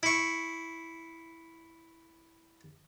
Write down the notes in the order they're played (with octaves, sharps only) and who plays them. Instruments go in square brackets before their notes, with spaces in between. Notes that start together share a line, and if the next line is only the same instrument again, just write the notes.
[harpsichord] E4 C#6